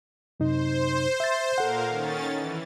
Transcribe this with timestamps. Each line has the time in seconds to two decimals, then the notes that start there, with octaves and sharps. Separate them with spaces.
0.40 F#2 C3 D#4 C5
1.20 E5 A6
1.58 A#2 A4 A#4 F5 F#5
1.88 D#3 C#4 A6
2.34 E3